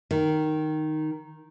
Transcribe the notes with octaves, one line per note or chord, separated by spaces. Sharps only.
D#3